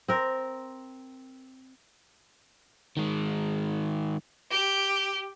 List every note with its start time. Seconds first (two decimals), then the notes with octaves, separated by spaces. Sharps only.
0.08 C4 A#4
2.97 D#3 G#3
4.51 G4